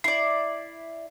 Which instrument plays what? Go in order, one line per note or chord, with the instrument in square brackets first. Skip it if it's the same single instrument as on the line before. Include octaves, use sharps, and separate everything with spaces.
[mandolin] E4 D5 [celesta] C7